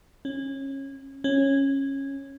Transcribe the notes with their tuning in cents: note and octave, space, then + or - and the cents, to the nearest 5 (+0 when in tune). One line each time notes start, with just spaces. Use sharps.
C#4 -25
C#4 -15